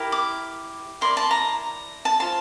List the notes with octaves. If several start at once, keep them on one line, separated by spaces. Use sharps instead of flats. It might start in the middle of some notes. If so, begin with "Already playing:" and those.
Already playing: E4 G4 A#4
D6
E4 A#4 D5 C6
A5
A#5
A5
F4 C5 A5